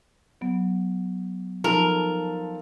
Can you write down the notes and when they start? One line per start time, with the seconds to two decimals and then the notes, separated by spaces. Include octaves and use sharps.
0.41 F#3 B3
1.64 F3 D#4 A4 A#4